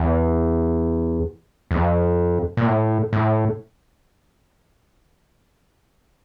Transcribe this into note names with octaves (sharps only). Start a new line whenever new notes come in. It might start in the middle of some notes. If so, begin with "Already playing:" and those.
Already playing: E2
E2
F2
A#2
A2
A2